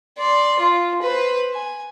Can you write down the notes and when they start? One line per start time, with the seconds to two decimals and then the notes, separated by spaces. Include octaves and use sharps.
0.18 D5 C6
0.59 F4
1.02 B4 C5
1.54 G#5